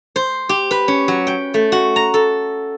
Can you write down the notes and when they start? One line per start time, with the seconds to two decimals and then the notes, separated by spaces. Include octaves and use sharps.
0.16 C5
0.49 G4
0.71 B4
0.88 C#4
1.08 F#3
1.27 G5
1.54 A3
1.72 F#4
1.96 A#5
2.14 A4